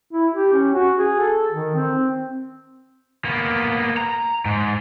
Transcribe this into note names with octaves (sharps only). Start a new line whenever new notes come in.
E4
G4
C#4
F#4
G#4
A4
D#3
C4
A#3 B3
A#5
G#2